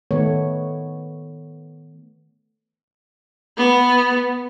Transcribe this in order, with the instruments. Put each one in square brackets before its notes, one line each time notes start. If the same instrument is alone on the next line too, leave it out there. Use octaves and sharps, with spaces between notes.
[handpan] D#3 A3 B3 C#5
[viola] B3